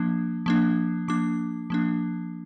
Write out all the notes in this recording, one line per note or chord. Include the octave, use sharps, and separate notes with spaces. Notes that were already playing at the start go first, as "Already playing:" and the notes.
Already playing: F3 A#3 D4
F3 A#3 D4
F3 A#3 D4 D6
F3 A#3 D4